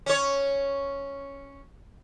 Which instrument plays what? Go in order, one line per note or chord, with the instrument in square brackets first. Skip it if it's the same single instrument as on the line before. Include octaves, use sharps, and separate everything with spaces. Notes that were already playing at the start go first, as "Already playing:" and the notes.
[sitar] C#4 C#5